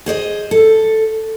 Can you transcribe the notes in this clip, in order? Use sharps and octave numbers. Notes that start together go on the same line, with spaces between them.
G#4 C5 D5 D#5
A4